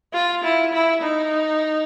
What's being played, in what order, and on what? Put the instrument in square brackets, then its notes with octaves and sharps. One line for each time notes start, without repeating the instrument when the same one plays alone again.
[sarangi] F4
E4
E4
D#4